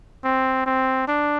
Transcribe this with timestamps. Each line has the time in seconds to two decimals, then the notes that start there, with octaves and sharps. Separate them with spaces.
0.24 C4
0.66 C4
1.08 D4